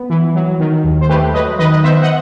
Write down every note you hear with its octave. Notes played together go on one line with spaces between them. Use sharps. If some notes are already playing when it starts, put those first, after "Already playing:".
Already playing: B3
E3
F#3
D#3
D#2
C5
A3 G4 B4
F#3 B4 D#5
D#3 B4 D#5
D#5
B3 C5 E5
D#5 F#5